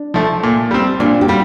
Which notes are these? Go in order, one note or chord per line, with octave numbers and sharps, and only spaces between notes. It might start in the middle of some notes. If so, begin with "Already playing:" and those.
Already playing: D4
F3 A3
A#2
G3 C4
A#2 D4 F4
G4
G3 D4 F4